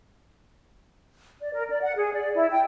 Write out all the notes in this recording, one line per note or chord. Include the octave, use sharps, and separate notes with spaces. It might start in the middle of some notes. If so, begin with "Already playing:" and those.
D5
A#4
D5
F#5
G#4
D5
E4
G5